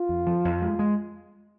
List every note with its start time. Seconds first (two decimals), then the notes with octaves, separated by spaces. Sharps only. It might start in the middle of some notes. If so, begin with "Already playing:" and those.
Already playing: F4
0.09 F2
0.27 F3
0.45 F2
0.62 G#3
0.79 G#3